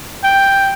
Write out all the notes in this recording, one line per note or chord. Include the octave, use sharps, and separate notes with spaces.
G5